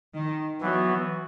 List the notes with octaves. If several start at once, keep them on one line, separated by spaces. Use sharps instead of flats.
D#3
E3 F#3 B3 F#4